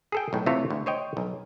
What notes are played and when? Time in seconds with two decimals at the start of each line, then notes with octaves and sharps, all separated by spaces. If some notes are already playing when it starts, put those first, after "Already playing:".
0.12 G#4 A4 G5
0.33 B1 A2
0.46 C3 E3 A3 F4 A4 C#5
0.70 D2
0.86 C5 C#5 D#5 G5
1.17 B1